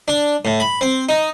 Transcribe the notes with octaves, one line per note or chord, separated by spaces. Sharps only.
D4
A2
B5
C4
D#4